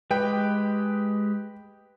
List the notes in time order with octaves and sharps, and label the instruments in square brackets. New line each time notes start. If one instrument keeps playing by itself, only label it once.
[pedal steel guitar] G#3 G4 [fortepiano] B4 G5